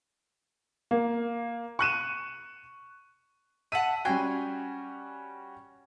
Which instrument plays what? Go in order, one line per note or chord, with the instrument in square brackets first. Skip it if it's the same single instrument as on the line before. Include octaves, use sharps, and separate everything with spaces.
[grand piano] A#3
C#6 F#6 D#7 E7
[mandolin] E5 F#5 [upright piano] A5 B6 D#7
[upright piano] G3 C#4 F#4 [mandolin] G5 G#5 C6